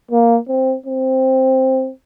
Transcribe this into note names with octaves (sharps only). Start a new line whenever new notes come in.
A#3
C4
C4